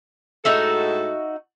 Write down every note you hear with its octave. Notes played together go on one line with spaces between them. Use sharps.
A2 G#3 D#4 F#4 A4 E5